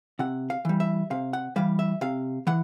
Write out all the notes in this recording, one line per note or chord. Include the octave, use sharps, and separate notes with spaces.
C3 F#5
F5
E3 G3
E5
C3 F5
F#5
E3 G3 F5
E5
C3 F5
E3 F#5